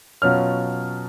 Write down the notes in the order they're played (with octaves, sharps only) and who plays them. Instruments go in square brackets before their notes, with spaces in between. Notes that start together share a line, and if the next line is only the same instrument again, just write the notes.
[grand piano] B2 F#3 C#4 F4 F6